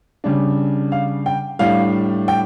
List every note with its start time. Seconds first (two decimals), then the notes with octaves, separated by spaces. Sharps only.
0.24 C#3 G3 D4
0.92 F5
1.26 G5
1.59 A2 G3 D4 F5
2.28 G5